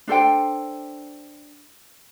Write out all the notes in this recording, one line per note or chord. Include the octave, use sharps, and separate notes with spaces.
D4 A4 C5 G5